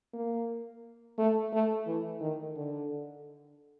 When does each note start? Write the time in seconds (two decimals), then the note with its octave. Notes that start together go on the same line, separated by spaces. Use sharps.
0.14 A#3
1.18 A3
1.53 A3
1.87 E3
2.21 D#3
2.56 D3